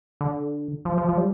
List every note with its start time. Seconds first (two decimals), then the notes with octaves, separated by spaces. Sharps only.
0.21 D3
0.85 F3
0.98 F3
1.09 F3
1.17 G3